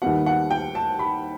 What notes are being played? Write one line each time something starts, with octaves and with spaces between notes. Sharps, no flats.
D#2 D#3 G3 B3 F#5
F#5
G5
A5
B5